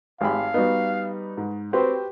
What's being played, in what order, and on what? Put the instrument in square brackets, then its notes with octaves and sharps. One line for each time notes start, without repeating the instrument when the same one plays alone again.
[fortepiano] G#1 G4 B5 [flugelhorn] F5
[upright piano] G3 D#4 [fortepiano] B3 F#4
[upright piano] G#2
[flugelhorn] C4 [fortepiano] F#4 B4 C5 [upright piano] G4